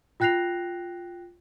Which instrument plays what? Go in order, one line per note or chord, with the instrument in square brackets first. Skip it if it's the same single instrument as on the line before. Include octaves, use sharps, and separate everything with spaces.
[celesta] F4 G5 F#6 A#6 C7 F7